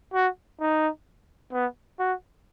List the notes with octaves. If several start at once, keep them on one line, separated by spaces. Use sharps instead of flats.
F#4
D#4
B3
F#4